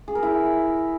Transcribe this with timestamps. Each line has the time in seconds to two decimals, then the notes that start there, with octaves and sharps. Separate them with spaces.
0.08 G#4
0.15 A#4
0.23 E4